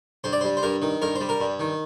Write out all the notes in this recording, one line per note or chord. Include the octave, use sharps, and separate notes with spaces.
G2 C5
D5
C5
G3
C5
G2 A#4
D#3
G2 A#4
C5
G3
A#4
G2
D#3